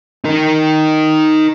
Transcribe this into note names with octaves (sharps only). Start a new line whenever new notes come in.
D#4 A#4